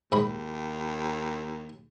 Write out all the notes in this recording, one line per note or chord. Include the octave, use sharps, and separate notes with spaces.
D#2 G#2 B5